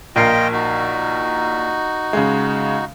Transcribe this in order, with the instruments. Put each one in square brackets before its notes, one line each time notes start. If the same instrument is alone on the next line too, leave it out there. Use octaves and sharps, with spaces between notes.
[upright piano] A#1 A#4 C7 [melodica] F4 D#5 G5
[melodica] D#4 F#4
[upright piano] C#3 G#3